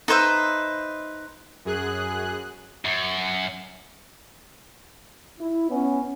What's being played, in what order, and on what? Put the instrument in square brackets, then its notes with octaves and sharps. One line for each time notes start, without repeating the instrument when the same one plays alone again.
[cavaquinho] D#4 B4 C5 E5
[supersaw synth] F#2 G#4 F#6
[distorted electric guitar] F#2
[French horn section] E4
B3 C#4